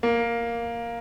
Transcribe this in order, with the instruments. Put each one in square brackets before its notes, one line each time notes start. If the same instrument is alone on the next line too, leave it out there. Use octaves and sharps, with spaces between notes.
[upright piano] A#3